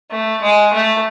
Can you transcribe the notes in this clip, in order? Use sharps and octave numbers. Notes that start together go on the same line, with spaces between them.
A3
G#3
A3